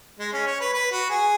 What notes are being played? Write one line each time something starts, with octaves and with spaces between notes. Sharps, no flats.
G#3
C#4
C#5
B4
B4
F#4
G#4